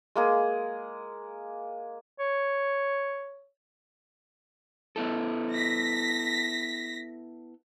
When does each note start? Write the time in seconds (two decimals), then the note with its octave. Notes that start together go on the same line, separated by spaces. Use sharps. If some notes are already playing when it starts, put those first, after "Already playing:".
0.16 G#3 A#3 G#4
2.19 C#5
4.96 B3 E4 A4
5.52 A#6 B6